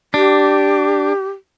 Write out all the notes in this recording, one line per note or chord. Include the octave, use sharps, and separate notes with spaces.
D4 G4